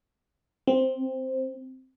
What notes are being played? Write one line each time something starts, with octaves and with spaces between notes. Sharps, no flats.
C4